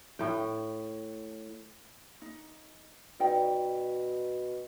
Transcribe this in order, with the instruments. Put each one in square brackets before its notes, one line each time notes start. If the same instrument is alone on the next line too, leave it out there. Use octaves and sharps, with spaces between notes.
[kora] A2 G5
[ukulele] D#4
[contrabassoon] B2 [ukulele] D#4 D5 G5